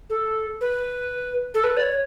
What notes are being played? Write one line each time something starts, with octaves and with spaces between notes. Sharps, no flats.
A4
B4
A4
B4
D5
C#5